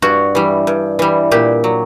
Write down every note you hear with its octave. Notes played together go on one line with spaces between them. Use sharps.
G2 F#4
E3 G3
G2
E3 G3
A#2 G4
F#3